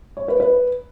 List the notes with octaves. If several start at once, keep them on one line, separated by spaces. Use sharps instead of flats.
C#5
B4
B4